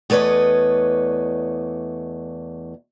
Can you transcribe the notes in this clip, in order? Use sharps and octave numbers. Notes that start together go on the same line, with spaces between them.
E2 A3 B4 C#5 D#5